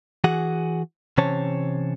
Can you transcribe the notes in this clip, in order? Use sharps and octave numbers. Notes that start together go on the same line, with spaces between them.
E3 F#4 G#4 F#5
C3 E3 C#4 C5 C#5 A5